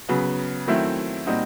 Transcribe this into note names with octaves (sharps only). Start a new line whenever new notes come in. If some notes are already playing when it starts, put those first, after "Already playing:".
C#3 F#3 B3
D#3 F#3 A3 C4 E4
A#2 G3 C4 D#4 F#4